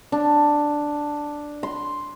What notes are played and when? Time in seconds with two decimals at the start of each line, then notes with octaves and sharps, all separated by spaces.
0.12 D4
1.63 C6